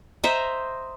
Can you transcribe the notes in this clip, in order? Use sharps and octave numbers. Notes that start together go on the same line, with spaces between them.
C5 D#5 E5 A#5